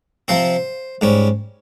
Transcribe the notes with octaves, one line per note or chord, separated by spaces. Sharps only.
C3 F3 C4 C5
G#2 G3 C#4